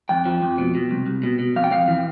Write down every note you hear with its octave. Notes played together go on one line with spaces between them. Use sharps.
F2 G5
F3
F2
B2
B2
C2
C2
B2
B2
F2 F5
G5
F2 F5
E3